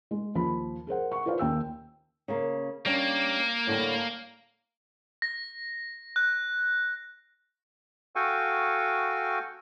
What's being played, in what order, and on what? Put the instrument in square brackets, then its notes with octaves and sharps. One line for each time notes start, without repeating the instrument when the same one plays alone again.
[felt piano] G#3
D#2 F3 B5
G#4 A#4 C5 F#5
F#5 C#6
F4 B4 C5 D5 F5
D#2 G5 E6
[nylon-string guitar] C#3 A#3
[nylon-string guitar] G3 C#4 D4 [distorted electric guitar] A#3
[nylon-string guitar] A2 D3 G3
[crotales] A#6
F#6
[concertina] F#4 A4 F5 G5 G#5 C#6